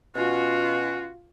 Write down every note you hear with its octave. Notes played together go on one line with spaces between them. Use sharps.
B2 C#4 F4 F#4